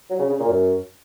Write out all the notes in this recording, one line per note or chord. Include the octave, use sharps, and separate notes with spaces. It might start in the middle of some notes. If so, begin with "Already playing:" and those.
F#3
C#3
C#3
A#2
F#2